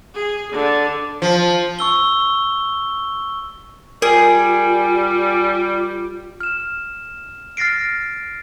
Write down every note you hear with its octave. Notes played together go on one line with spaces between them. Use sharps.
G#4
D3
F3
C#6 E6 G7
G3 F4 G#4 A#4
F6 E7
F6 A6 A#6 C7 D7